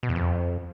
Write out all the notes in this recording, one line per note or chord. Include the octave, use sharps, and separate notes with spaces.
B2
E2
F2